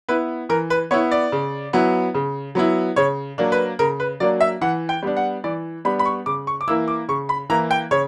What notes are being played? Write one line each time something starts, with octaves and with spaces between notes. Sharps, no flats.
B3 E4 B4
E3 A#4
B4
B3 E4 C#5
D5
C#3
F#3 B3 E4
C#3
F#3 B3 E4
C#3 C#5
F#3 A#3 D4
B4
C#3 A#4
B4
F#3 A#3 D4 D5
E5
E3 F#5
G5
G3 B3 D4
F#5
E3 D5
G3 B3 D4 B5
B5
C#6
C#3 D6
C#6
D6
E3 A#3 E4 E6
D6
C#3 C#6
B5
E3 A#3 E4 A#5
G5
C#3 C#5